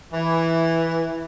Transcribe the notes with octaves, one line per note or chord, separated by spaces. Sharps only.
E3